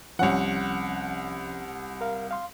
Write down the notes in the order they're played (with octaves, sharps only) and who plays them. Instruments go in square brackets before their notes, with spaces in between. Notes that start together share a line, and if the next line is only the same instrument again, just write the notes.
[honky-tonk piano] C2 F#5 [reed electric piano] F3 C#4
[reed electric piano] A#4 F5
F5 C6